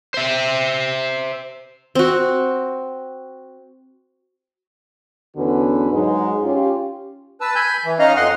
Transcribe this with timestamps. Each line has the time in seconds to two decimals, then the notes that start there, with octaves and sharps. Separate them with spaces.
0.14 C5 E5
1.95 C4 F#4
5.37 E2 D3 B3 C#4 F#4 B4
5.92 G#2 F#3 G#3 D#4
6.43 C#4 F4 G4
7.41 B4 A5 E6
7.55 G#5 B5 G6
7.85 E3
7.99 C#4 D#4 D#5 F5 A#5
8.16 F2 D#5 F#5 C6